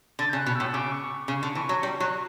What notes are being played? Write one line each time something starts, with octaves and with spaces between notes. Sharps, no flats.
D3 A6
G6
C#3
F#6
B2
A2 E6
C#3 D6
C#6
C#3 C#6
D3
E3 C#6
F#3
G3
F#3 F#6